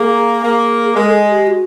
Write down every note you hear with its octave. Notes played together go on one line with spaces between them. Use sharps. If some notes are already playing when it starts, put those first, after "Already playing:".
Already playing: A#3 G#4
A#3
G#3 A#4
A4
G#4
G4
F#4